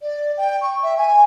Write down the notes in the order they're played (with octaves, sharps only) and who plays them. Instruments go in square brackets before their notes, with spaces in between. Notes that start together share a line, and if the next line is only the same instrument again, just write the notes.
[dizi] D5
G5
C#6
E5
G#5